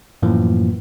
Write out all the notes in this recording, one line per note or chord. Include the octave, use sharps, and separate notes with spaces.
F#2 A2 E3 F3 A#3